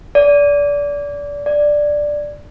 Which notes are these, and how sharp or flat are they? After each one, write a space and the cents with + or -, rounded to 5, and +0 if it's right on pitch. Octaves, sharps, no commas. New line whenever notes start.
D5 -25
D5 +5